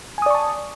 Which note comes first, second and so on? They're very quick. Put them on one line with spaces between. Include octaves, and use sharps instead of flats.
G#5 D#6 D5 C#6 A5